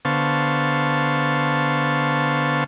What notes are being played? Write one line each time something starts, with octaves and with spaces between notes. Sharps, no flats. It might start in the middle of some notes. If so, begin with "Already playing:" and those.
D3 B3 C5 F5 A5 C#6